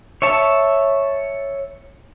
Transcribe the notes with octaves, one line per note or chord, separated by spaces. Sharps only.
C#5 E5 A5